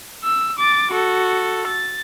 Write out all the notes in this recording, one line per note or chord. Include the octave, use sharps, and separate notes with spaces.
E6
D6 A6
F#4 A4
A6